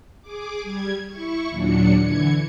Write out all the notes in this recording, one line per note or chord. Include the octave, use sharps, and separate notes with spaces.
G#4 D6
G3 G#6
E4 C#6
D#2 A#2 F#3 D4 C#7
D3 E3 G#6 C#7